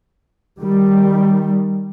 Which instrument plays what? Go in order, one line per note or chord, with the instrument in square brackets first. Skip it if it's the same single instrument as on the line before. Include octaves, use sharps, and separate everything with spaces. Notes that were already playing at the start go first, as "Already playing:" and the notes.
[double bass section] D#3 G3